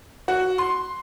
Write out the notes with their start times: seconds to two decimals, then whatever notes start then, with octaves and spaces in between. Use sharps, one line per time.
0.28 F#4
0.58 C6